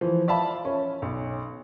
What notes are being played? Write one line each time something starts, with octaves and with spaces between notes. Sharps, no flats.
E3 F3
D5 E5 F5 A5 B5
C#4
B1